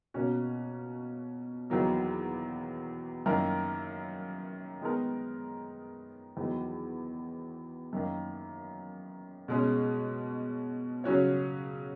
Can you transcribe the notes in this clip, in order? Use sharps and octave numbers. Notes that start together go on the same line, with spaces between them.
B2 A#3 C#4 F#4
E2 D#3 F#3 A#3
F#2 D#3 A#3 E4 A#4
D#3 G#3 B3 D#4 A#4
E2 D#3 F#3
F#2 D#3 A#3
B2 G#3 C#4 G#4
C#3 F#3 C#4 F#4 C#5